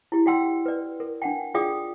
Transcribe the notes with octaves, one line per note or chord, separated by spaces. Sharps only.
E4 G4
F#4 D5 F#5 G5 C6 E6
B4 D5
A#4
D4 F#5 G5
F4 G#4 D5 F5 G5 D#6